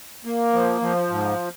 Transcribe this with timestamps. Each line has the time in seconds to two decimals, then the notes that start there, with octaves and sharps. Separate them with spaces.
0.25 A#3
0.53 F3
0.81 F3
1.10 G#2